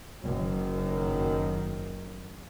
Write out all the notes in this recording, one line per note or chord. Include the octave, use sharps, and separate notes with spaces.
F#1 F#2 D#3